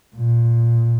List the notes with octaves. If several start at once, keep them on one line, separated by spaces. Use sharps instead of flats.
A#2